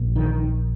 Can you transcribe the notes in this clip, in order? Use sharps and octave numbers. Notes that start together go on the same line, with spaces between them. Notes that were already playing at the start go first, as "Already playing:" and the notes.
Already playing: A#1 A#2
D#3